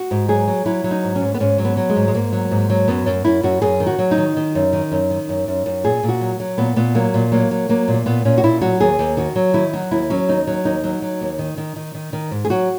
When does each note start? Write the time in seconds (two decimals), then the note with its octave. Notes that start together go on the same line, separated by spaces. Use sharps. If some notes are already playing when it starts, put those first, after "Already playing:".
Already playing: F#4
0.11 G#2
0.28 F#3 G#4
0.48 F#3
0.66 F#3 E4
0.84 F#3
0.91 D#4
1.04 G#2
1.16 C#4
1.21 G#2
1.34 B3
1.40 G#2 C#4
1.58 F#3
1.65 B3
1.77 F#3
1.90 G#3
1.96 G#2
2.08 G#3
2.14 G#2 A#3
2.32 F#3
2.51 G#2
2.70 F#3
2.88 F#2 B3
3.06 F#2
3.25 F#2 E4
3.43 F#2 F#4
3.62 F#2 G#4
3.80 D#3
3.87 F#4
3.99 F#3
4.11 D#4
4.18 D#3
4.37 D#3
4.55 F#2
4.73 D#3
4.92 F#2
5.10 D#3
5.29 F#2
5.48 F#2
5.66 F#2
5.84 A#2 G#4
6.03 A#2
6.09 F#4
6.21 F#3
6.40 F#3
6.58 A#2 B3
6.76 A#2 B3
6.95 F#3 A#3
7.14 A#2
7.32 F#3 A#3
7.51 F#3
7.69 F#3 A#3
7.88 A#2
7.94 A#3
8.06 A#2 B3
8.25 A#2 C#4
8.38 F#4
8.44 A#2 E4
8.61 F#3 F#4
8.80 D#2 G#4
8.99 D#2
9.17 D#3 F#4
9.36 F#3
9.54 D#3 E4
9.73 F#3 F#4
9.91 D#2 E4
10.10 F#3 C#4
10.28 D#2 D#4
10.47 F#3
10.65 D#2 D#4
10.84 F#3
11.02 F#3
11.21 D#2
11.39 D#3
11.57 D#3
11.76 D#3
11.95 D#3
12.13 D#3
12.31 G#2
12.45 G#4
12.50 F#3 F#4